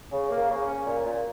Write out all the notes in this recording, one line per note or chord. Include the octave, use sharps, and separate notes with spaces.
C#3
A#3
C#3
C#4
A#2
A#2